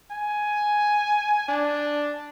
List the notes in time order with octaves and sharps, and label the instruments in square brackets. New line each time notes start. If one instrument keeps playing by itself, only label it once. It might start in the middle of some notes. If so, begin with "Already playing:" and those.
[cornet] G#5
D4